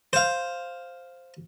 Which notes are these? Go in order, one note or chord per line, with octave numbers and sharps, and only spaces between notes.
C5 F5